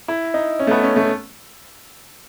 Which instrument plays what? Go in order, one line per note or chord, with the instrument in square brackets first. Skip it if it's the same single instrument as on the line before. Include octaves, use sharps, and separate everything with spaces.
[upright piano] E4
D#4
C#4
A3
B3
C#4
A3